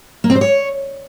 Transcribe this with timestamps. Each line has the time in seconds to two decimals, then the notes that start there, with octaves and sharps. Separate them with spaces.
0.24 A#3
0.30 C4
0.35 C5
0.41 C#5